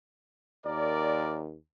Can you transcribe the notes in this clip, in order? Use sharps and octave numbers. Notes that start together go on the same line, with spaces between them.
D#2 A#4 D5